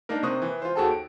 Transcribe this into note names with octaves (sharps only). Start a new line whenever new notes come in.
A#3 D4 D#4 A#4
C3 A#3 C5 C#6 D#6 F#6
E3
F4 C5
D#2 F#4 G#4 A4 G5 A5
D7